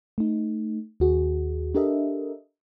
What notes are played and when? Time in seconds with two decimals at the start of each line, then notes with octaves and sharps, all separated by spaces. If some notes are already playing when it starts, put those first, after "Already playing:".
0.18 A3 D#4
1.00 D#2 F#4 G#4
1.74 D4 G4 A4 A#4 D#5 E5